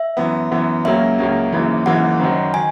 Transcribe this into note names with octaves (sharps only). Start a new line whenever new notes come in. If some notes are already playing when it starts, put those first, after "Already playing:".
Already playing: E5
F#2 E3 B3
F#2 E3 B3
C#2 C#3 F#3 A#3 C#4 E5
C#2 C#3 F#3 A#3 C#4
G#1 F#2 C#3 E3 A#3
G#1 F#2 C#3 E3 A#3 F#5
F#1 F#2 D#3 F#3
D#3 G#5